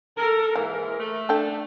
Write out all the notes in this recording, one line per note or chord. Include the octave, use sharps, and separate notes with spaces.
A4 A#4
G#2 E3 G#3 A#3 A#4
A3
D4 A4 G5